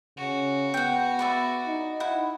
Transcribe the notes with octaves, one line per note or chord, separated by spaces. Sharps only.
C#3 F#4
B3 F#5 G5
B4 D5 E5
D#4
E4 F#5